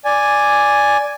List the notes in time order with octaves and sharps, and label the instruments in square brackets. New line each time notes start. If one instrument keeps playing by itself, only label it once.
[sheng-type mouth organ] D5 G#5